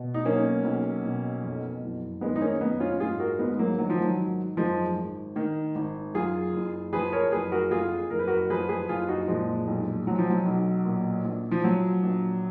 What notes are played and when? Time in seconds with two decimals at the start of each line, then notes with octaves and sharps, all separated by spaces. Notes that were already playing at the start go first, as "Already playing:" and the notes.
Already playing: B2
0.14 D#4
0.25 B1 A#3 C#4
0.65 B1
1.05 B2
1.43 F2
1.82 F#1
2.21 D#3 G#3 B3
2.36 D#4
2.41 A#3 C#4
2.60 F#1 B3 D#4
2.80 C#4 F4
3.00 G#2 F4 G#4
3.19 F#4 A#4
3.39 G#1 G#3 B3
3.59 F#3 A#3
3.79 D#3 F#3
3.90 F3
4.00 F#3
4.18 G#1
4.57 F#2 F3 G#3
4.96 G#1
5.36 D#3
5.75 G#1
6.14 F#2 F4 G#4
6.53 F#1
6.92 F3 G#4 B4
7.12 A#4 C#5
7.31 F#1 G#4 B4
7.51 F#4 A#4
7.71 F2 F4 G#4
8.10 F#1 A#4
8.19 B4
8.27 F#4 A#4
8.50 F3 G#4 B4
8.69 G#4 B4
8.89 F#1 F4 G#4
9.08 D#4 F#4
9.28 A#2 F3 G#3
9.68 B1
10.07 F3 F#3
10.18 F3
10.29 F#3
10.46 B1
10.85 A#2
11.25 A#1
11.51 F3
11.64 F3 F#3
12.03 A#1